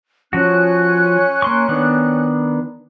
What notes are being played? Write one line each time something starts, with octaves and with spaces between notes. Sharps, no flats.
F3 C#4 F#4 F#6
A#3 C6 C#6
D#3 B3 D4